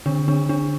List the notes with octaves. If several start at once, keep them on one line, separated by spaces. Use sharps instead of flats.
D3 D4
D3 D4
D3 D4